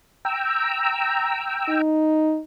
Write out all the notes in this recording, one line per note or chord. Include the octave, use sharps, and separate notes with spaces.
G5 A#5 E6
D#4